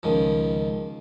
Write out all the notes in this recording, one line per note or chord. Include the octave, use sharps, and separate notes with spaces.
C#2 D#3 F3